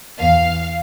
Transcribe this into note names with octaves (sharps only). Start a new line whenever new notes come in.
E2 F5